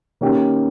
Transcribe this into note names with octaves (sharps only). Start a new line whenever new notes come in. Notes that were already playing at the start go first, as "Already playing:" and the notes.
D#3 A#3 C#4 G4